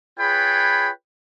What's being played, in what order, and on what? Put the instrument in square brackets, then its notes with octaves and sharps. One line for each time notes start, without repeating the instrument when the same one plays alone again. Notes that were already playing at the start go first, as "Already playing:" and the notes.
[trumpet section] F4 G#4 B4 C#5 G5 B5